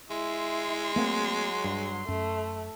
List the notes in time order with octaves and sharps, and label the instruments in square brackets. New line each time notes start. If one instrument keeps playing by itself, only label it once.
[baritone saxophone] G#3 [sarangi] E4 [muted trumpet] C6
[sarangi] F#3 [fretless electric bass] A3 A#3 C4
[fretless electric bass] G2
[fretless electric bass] F#2 [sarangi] A3